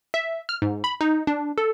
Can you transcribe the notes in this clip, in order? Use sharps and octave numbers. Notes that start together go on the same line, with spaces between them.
E5
F6
G#2
B5
D#4
D4
A4